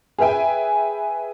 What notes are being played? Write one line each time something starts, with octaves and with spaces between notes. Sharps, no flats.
G#4 B4 E5 G5 G#5